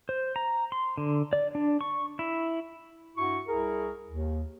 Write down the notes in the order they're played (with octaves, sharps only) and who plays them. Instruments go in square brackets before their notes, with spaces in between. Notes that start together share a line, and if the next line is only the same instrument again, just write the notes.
[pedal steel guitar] C5
A#5
C6
D3
D5
D4
C#6
E4
[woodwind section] G2 E4 F#4 C#6
C2 E4 G#4 A#4
D#2